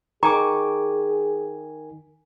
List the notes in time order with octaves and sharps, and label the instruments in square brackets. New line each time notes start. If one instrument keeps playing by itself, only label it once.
[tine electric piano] D#3 G#5 [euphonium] G#4 [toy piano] A#5 [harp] C#6 D6